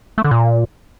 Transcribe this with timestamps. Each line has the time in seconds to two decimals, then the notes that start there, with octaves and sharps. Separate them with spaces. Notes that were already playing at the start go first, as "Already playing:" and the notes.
0.18 A3
0.24 D3
0.31 A#2